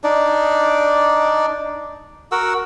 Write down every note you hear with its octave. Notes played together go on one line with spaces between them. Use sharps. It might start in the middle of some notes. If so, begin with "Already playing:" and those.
D4 D#4 D5
F#4 A#4 F#5 E6